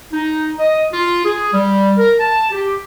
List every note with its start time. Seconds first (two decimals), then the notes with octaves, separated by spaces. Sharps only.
0.12 D#4
0.59 D#5
0.92 F4
1.25 G#4
1.53 G3
1.98 A#4
2.20 A5
2.51 G4